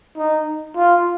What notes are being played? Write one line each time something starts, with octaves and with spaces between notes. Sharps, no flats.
D#4
F4